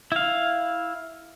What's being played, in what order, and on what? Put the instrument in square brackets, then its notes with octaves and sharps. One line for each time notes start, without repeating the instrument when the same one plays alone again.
[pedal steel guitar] E4 F5